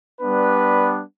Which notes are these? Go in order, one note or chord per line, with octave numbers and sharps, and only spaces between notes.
G3 B3 D4 B4